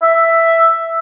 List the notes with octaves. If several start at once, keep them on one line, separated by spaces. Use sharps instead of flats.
E5